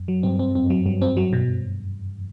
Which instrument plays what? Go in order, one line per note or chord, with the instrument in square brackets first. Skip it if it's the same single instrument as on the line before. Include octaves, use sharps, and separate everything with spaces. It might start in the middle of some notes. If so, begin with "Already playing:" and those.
Already playing: [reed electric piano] F#2
[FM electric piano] F#3
[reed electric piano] G2 [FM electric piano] C4
[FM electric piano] C4
[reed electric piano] F#2 [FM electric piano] C4
[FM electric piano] F#3
[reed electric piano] G2 [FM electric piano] F#3
[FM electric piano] C4
F#3
B2